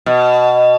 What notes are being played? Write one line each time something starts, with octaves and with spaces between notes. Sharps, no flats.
B2